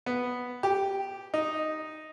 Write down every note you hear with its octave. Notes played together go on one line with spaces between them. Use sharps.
B3
G4
D#4